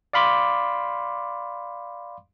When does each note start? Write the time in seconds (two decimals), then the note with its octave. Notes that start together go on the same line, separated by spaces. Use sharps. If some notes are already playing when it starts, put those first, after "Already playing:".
0.13 D5 F5 B5 C6 D6